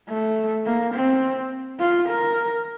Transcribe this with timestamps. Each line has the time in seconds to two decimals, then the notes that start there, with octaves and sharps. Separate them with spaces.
0.09 A3
0.66 A#3
0.95 C4
1.80 F4
2.09 A#4